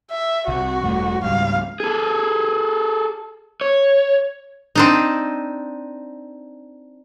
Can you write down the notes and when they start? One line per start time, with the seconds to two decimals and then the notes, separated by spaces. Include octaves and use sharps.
0.11 E5
0.48 C2 F#4
0.82 E1 G2 A3
1.24 C#2 G#2 G3 F5
1.80 G#4 A4
3.61 C#5
4.75 C4 D4 D#4